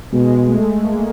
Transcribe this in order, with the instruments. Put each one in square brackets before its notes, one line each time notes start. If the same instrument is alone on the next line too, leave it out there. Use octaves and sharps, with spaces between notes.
[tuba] B2 [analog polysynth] G#3
[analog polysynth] A3
A#3